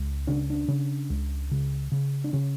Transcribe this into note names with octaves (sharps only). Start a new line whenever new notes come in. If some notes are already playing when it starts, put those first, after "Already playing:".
Already playing: C#2
C#3 D4
D4
C#3
C#2
C#3
C#3
D4
C#3 C#4